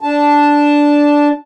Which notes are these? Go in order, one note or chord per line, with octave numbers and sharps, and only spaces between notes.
D4 A5